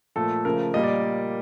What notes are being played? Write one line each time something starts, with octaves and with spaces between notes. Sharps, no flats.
A#2 F3 A3 A4
C#3 F3 A3 A#4
A#2 G3 A#3 D#5
D5